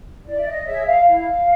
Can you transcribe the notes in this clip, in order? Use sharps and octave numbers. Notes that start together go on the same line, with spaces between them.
E4 D5
E5
D#5
G#4 C#5 E5
F5
E4 F5